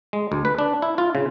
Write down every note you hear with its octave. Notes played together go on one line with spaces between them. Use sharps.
G#3
D2
B4
D4
E4
F4
C#3